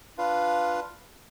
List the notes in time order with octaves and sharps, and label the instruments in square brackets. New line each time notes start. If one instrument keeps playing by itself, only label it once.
[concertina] D4 F4 B4 F5